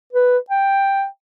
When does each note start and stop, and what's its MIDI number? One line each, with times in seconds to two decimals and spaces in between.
0.13 0.38 71
0.50 1.06 79